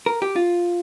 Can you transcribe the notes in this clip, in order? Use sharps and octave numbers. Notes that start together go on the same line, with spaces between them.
A#4
G4
F4